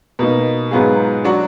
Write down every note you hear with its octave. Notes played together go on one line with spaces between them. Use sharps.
B2 A#3 D#4
G#2 F#3 B3 F4 G#4
F#3 D4 F#4